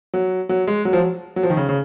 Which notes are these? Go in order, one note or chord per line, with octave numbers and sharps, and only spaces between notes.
F#3
F#3
G#3
F#3
F3
F#3
F#3
F3
D#3
C#3
C#3